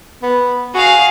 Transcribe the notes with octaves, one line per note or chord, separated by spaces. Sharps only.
B3
F#4 G#4 F5